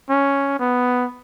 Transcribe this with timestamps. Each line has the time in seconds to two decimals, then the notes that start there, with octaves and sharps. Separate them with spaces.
0.09 C#4
0.59 B3